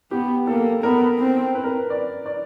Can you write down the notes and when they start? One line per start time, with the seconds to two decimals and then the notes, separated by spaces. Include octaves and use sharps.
0.11 B3 G4
0.47 A#3 A4
0.83 B3 A#4
1.18 C4
1.55 B4
1.64 A#4
1.73 B4
1.90 D5
2.26 D5